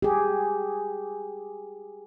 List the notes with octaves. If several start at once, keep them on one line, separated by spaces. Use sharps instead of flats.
G4 G#4